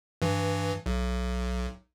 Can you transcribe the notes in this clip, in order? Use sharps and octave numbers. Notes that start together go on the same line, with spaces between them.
G2 E3
B1